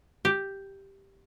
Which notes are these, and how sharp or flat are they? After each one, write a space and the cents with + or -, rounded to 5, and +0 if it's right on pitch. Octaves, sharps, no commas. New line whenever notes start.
G4 +0